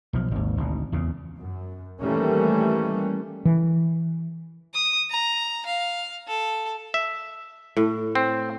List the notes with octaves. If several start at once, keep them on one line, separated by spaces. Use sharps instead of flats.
B1 F3
G#1 D#2
G#1 D2 B2
E2 C#3
F#2
D#3 E3 G3 A3 A#3 C#4
E3
D#6
A#5
F5
A4
E5
A2
C4